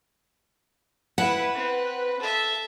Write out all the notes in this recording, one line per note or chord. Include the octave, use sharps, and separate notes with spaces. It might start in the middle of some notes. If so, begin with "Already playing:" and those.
E4 B4 F#5
C4
A4 E5